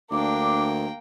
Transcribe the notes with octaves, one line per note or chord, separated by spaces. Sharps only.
D2 A#3 D4 G5 D6